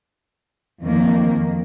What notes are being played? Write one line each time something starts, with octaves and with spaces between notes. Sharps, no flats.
F2 D#3 A#3